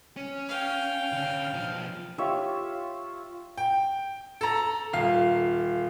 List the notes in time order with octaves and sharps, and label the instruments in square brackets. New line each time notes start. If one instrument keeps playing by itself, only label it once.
[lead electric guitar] C#4
[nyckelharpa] F5 G5
[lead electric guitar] D3 C#4
B1 F3
[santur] F4 G4 C#5 E5
[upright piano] G5
A4 A#5
D#1 F5